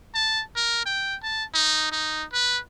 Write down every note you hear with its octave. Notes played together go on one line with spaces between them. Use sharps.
A5
A#4
G5
A5
D#4
D#4
B4